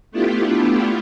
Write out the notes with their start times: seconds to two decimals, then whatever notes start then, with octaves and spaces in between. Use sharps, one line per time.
0.11 A3 B3 D4 E4 F4 G4